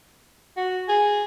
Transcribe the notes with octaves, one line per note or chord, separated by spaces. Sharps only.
F#4
G#4